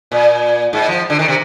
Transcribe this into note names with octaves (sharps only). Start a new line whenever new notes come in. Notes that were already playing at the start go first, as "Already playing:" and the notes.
A#2
G#2
F3
D3
D#3
C3